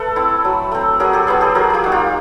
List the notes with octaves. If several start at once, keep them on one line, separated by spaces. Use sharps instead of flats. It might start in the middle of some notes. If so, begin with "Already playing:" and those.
Already playing: A3 A4 B4
C4 E4
F#3
A3 C4
F#3 G#4 A#4
G4 A4
B3 E4 F#4 G#4
G4 A4
F#3 G#4 A#4
F4 G4 G#4
A#3 D#4 F#4
F4 G4